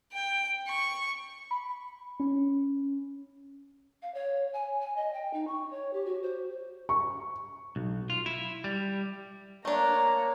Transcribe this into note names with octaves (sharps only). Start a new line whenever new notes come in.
G5
C#6
B5
C#4
F5
C#5
G#5
G#5
D#5
G5
D#4
C#6
C#5
G4
F#4
C5
C#6
B1
F4
E4
G3
A3 A#3 D4 C#5 A#5